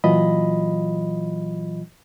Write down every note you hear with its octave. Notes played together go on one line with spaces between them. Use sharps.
A#2 E3 F#3 F4 D#5 B5